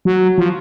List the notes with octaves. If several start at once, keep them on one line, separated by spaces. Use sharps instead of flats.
F#3
F3